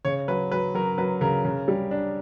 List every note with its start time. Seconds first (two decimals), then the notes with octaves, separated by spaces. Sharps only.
0.05 C#3 C#5
0.28 F#3 B4
0.52 F#3 B4
0.75 F#3 A#4
0.98 F#3 B4
1.21 C#3 A#4
1.45 C#3
1.68 G3
1.91 D4